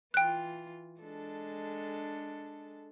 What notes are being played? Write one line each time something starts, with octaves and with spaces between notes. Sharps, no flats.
E3 F4 G5 F#6
G#3 D4 A4